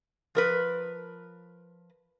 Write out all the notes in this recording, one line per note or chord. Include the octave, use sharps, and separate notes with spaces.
F3 A#4 B4